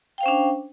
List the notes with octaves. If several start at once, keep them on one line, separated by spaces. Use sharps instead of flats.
C#4 D4 C5 F5 G5